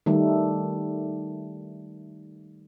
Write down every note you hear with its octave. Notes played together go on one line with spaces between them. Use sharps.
D#3 G3 A3